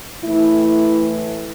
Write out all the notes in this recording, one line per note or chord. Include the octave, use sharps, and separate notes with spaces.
A2 E3 A3 E4